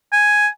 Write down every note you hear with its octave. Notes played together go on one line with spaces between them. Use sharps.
G#5